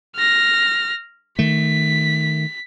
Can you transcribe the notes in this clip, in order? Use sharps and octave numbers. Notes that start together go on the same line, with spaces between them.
F6 A#6
D#3 A3 B6